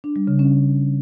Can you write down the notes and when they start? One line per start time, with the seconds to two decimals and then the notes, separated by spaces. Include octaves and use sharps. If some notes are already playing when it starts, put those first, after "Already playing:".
0.04 D4
0.16 G3
0.27 C#3
0.39 C#4